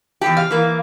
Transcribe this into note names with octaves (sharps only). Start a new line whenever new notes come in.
E2 G2 G4
F5
E3 A#3